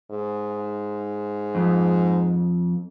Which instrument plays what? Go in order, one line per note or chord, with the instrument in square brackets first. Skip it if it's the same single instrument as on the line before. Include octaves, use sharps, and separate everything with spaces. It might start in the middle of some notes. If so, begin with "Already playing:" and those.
[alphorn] G#2
[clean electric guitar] F2